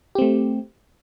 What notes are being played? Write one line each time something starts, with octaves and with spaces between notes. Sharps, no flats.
A3 C4 G4